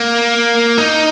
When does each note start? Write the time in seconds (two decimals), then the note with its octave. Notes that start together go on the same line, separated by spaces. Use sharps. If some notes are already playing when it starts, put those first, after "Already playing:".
Already playing: A#3
0.78 D#4